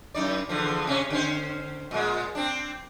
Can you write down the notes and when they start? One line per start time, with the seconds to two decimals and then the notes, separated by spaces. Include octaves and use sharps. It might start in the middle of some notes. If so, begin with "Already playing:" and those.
0.15 F#2 D#4 D5
0.49 E2 D3 F3
0.87 C3 C#4
1.10 D3 C#4 C5
1.91 A#2 G#3
2.35 C4 D4